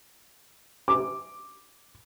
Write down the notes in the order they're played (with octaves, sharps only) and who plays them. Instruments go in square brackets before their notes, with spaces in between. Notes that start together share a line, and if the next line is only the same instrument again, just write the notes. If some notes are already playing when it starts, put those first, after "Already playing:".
[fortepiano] D6